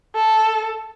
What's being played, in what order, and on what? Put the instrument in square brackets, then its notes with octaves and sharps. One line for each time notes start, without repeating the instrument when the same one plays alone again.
[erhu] A4